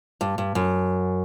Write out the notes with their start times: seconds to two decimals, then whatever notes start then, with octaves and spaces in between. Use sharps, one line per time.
0.21 G2
0.38 G2
0.55 F#2